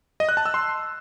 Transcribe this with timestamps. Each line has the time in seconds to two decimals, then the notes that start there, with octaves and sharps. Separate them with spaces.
0.20 D#5
0.29 F#6
0.37 A5
0.46 E6
0.54 C6